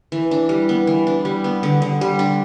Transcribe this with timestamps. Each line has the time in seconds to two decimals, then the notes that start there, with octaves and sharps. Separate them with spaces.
0.12 E3
0.31 D4
0.49 G3
0.69 B3
0.87 E3
1.07 D4
1.25 G3
1.44 B3
1.63 D3
1.82 D3
2.01 G3
2.19 D4